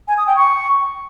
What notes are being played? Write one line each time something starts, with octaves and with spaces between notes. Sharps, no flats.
G#5
D#6
G5
C#6